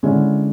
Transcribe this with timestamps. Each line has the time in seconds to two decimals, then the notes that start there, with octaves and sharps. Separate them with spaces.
0.03 D3 G#3 C#4 E4